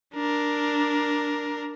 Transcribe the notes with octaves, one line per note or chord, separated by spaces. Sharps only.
D4 A#4